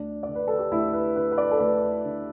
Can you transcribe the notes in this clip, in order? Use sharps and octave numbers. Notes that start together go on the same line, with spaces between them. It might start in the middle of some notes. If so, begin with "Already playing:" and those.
Already playing: D2 D4
D3 D5
B4
A4
G4
D2 E4
B4
D3 B4
B4
D5
A4
D2 B4
D3